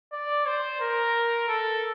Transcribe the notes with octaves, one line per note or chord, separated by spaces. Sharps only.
D5
C5
A#4
A4